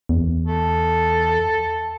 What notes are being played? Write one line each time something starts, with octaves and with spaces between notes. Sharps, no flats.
E2
A4